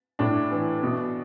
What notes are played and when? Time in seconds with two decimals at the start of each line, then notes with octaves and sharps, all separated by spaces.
0.19 A2 D4
0.51 E3
0.83 B2